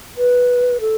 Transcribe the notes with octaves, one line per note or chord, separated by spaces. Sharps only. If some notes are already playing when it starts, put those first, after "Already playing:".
B4
A4